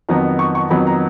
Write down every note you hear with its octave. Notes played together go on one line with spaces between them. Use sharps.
F2 D#3 F#3 B3 A#5
C#6
C#6
F2 D#3 F#3 B3 B5
A#5